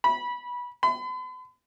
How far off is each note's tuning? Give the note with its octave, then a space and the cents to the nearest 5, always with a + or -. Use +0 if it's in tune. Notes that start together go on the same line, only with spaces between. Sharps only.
B5 -20
B5 +45